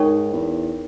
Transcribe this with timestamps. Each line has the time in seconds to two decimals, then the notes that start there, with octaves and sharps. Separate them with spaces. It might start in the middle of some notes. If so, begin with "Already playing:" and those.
Already playing: G#2 D#4 A#4 C#5 G5 C#6
0.33 E2